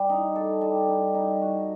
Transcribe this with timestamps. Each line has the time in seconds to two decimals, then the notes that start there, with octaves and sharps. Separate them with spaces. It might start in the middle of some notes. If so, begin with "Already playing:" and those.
Already playing: G3
0.09 D#4
0.36 A4
0.61 G3
0.88 D#4
1.14 D#4
1.41 F#4